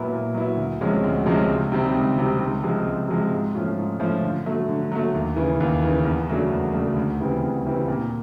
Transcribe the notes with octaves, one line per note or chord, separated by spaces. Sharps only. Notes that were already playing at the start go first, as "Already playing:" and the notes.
Already playing: A#2 F#3 B3 E4
A#2
F#3 B3 E4
D2
C3 F3 G#3 C#4
D2
C3 F3 G#3 C#4
C#2
C3 D#3 G3 C4
C#2
C3 D#3 G3 C4
C#2
C3 F3 G#3
C#2
C3 F3 G#3
G#2
F3 A3 C#4 F4
G#2
F3 A3 C#4 F4
D3
F#3 A3
D3
F#3 A3
D#2
C#3 E3
D#2
C#3 E3
E2
C#3 F#3 A3 D4
E2
C#3 F#3 A3 D4
D2
C#3 E3 G3 C4
D2
C#3 E3 G3 C4
A#2